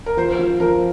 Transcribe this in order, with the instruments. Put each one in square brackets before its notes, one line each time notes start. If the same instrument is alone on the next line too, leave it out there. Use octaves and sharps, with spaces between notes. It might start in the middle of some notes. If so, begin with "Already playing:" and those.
[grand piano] A#4
[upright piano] F3 [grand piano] C5
[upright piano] F3
[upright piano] F3 [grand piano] A#4